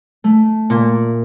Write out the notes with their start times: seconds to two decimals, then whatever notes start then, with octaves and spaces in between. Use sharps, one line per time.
0.24 A3
0.70 A#2